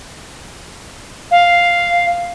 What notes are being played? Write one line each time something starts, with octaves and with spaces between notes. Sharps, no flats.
F5